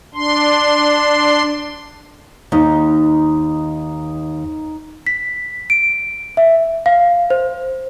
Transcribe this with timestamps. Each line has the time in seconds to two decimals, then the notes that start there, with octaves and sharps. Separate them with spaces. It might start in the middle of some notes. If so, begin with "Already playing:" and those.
0.14 D4 C6
2.52 D#2 D#4
5.07 B6
5.70 D7
6.37 E5
6.86 F5
7.30 C5